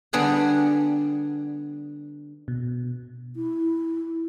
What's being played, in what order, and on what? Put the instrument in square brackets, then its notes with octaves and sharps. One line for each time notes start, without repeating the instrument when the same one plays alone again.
[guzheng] D3 G3 B3 D4 G#4 F#5
[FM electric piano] B2
[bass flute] E4